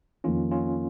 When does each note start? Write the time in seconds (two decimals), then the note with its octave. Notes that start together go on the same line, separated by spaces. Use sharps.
0.24 F2 D#3 A#3 C#4 F4
0.51 C#4 F4